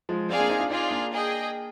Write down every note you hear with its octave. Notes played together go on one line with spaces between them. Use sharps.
F3 G#3
G#3 C4 G#4 D5 F5
A#3 D4
C4 D#4
D4 F4
C4 D#4 F4 G#4 D5
A#3 D4
G#4 D#5 G5